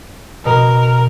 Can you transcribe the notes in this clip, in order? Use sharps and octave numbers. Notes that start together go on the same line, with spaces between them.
B2 A#4